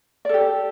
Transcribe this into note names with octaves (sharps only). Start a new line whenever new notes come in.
G4 A4 D5